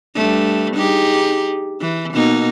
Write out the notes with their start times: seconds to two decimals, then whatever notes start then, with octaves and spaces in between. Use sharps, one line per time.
0.15 G2 A3
0.76 D#4 G4 G#4
1.81 E3
2.14 B2 A#3 D#4